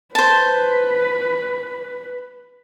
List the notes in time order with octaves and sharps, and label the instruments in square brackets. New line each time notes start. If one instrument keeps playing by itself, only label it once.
[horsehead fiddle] B4 [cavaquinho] C5 A5